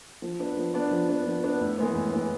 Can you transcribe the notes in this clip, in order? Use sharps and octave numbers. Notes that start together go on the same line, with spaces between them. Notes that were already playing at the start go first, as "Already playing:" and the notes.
F3
B3 D4
F3
B3 D4
F3
B3 D4
F3
B3 D4
A2
E3 G#3 B3
A2
E3 G#3 B3